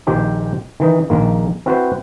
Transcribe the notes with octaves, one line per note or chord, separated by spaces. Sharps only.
A#1 A#2 D#3 G4 C5 G5
D#3 E3 D#4
A#1 D#3 A#3
C4 E4 F#4 B4 C5